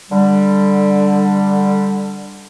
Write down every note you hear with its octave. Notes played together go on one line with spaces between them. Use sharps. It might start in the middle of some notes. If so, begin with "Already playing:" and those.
D3 G3